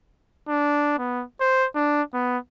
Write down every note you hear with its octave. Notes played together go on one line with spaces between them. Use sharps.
D4
B3
C5
D4
B3